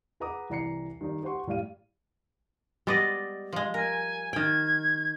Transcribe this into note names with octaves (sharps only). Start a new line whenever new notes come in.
G#4 B4 F#5 A#5 D6 D#6
C2 E3 D5 A#5 C7 C#7
D#3 G3 D#4 D5
G4 C5 F#5 C6 C#6
A2 G3 D5 F5 D#7
G3 G#3 B3 D5 D#5
F3 G#3
A#4 G#5
D#3 G5 G#6